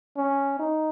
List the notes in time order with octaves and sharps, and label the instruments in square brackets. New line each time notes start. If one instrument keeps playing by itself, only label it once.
[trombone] C#4
D#4